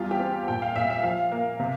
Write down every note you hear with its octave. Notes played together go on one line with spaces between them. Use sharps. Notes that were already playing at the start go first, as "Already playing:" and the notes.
Already playing: E2 G3 F4
G4
C4
A#2 G5
F5
A#2 E5
E5
F3 F5
A#3
C3